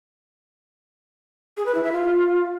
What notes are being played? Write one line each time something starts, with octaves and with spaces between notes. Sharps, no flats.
G#4
B4
E4
E5
F4